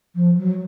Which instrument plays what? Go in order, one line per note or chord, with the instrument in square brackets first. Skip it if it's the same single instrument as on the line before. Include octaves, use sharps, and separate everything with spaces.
[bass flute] F3
F#3